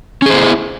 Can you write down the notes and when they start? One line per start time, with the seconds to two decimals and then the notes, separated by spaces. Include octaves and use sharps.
0.22 C#4
0.26 G#4
0.30 C5
0.33 B3
0.37 E4